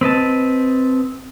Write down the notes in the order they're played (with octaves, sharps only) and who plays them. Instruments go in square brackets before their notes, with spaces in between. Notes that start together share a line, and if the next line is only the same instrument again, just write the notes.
[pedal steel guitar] C4 B4 D#5 A5